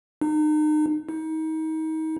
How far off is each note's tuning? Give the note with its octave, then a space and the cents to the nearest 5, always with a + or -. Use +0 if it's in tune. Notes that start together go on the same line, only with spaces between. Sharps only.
D#4 -35
D#4 +30